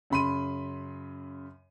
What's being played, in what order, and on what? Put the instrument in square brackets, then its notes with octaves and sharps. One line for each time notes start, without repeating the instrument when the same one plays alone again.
[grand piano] F#2 C#3 B5 C6 D#7